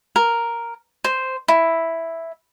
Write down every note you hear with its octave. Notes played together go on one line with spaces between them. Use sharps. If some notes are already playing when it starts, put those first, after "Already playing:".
A#4
C5
E4